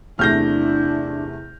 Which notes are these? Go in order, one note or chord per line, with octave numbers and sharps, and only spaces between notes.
E2 C3 A3 D4 E4 F6 G6 A#6